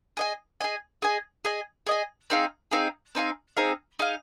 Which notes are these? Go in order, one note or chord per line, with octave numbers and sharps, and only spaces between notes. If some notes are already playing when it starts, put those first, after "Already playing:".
G#4 D#5 G#5
G#4 D#5 G#5
G#4 D#5 G#5
G#4 D#5 G#5
G#4 D#5 G#5
C4 D#4 G#4 F5
C4 D#4 G#4 F5
C4 D#4 G#4 F5
C4 D#4 G#4 F5
D#4 G#4 F5